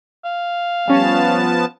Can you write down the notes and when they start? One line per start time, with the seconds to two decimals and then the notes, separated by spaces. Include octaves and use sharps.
0.25 F5
0.88 F3 G3 B3 C#4 A5